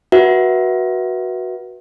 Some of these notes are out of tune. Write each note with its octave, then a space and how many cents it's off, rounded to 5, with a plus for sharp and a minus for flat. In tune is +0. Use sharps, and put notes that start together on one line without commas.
F#4 +0 B4 -25 E5 -5